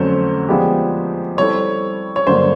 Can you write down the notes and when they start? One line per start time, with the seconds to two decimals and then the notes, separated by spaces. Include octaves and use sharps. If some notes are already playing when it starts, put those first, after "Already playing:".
Already playing: F2 D3 F#3 A3 C#4 C5
0.48 F3 G#3 B3 D4 G4
1.37 G3 C4 E4 A4 C5 C#5
2.16 C#5
2.27 G2 D3 F#3 A#3 D4 C5